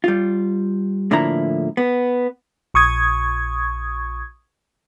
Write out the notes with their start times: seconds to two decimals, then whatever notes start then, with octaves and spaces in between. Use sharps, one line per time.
0.04 G3 F4
1.11 A2 D3 F3 A#3 E4 A#5
1.77 B3
2.74 A#1 C#6 D#6 G#6